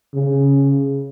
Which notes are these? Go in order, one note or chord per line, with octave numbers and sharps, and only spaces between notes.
C#3